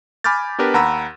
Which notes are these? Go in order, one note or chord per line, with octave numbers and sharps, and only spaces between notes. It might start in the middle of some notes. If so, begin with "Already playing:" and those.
G#5 B5 D6 F6 G6 A6
B3 D4 G4 A#4 B4
D#2 F#5 A#5 B5 E6